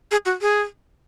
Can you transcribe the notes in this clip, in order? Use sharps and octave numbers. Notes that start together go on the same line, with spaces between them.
G#4
F#4
G#4